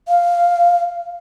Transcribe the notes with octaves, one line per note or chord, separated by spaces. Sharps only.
F5